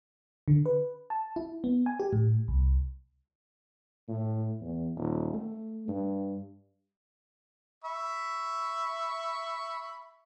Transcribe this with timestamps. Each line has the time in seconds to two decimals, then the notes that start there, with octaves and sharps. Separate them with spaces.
0.48 D3
0.66 B4
1.10 A5
1.36 E4
1.64 B3
1.86 G#5
2.00 G4
2.13 A2
2.48 C2
4.08 A2
4.61 E2
4.97 D#1
5.34 A3
5.88 G2
7.84 E5 B5 C#6